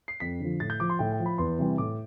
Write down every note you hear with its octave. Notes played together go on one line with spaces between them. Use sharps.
C7
F2 B6
D3 F3
A2 A6
G6
F3 D6
C6
A2 G5
G5
F3
B5
E2 C6
C3 E3 G3
A2 D6